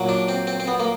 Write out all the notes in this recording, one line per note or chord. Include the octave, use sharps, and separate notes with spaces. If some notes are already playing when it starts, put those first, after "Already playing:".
Already playing: A#2 F#3
D4
C4
C4
C4
B3
A#3